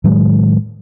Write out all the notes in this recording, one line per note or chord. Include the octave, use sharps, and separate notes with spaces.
A2 D#3 F#3 G#3